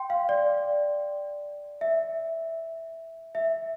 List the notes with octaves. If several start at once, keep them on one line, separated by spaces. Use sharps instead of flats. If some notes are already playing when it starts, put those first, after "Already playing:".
Already playing: G5 C6
F5
D5
E5
E5